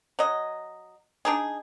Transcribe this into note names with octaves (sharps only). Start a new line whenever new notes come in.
F#3 D#5
D4 D#4 G#4